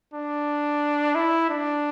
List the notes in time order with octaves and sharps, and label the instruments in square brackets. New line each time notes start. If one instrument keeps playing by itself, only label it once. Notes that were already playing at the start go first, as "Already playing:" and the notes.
[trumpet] D4
E4
D4